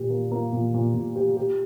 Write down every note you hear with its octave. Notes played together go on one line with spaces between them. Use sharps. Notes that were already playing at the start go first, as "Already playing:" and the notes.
Already playing: A#2 G4
A#3
A#3
A#2
A#2
A#2
G4
G4